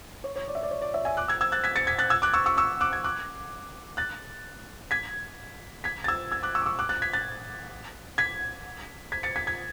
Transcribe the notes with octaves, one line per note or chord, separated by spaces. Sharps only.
C#5
C#5
D5
E5
D5
C#5
D5
C#5 E5
E5 G#5
D6 F#6
E6 G#6
E6 G#6
F#6 A6
G#6 B6
A6 C#7
G#6 B6
F#6 A6
E6 G#6
D6 F#6
C#6 E6
C#6 E6
C#6 E6
D6 F#6
G#6
D6 F#6
F#6 A6
G#6 B6
G#6 B6
A6
E6 G#6
E6 G#6
D6 F#6
C#6 E6
D6
C#6 E6
D6 F#6
F#6 A6
G#6 B6
F#6 A6
G#6 B6
G#6 B6
A6 C#7
G#6 B6
G#6 B6